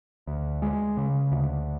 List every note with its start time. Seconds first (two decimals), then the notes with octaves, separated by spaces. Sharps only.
0.27 D2
0.62 G#3
0.97 C#3
1.32 D2